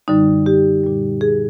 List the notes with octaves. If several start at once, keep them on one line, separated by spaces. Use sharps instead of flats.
F#2 D3 G3 D#4
G4
A#2 G3
G#4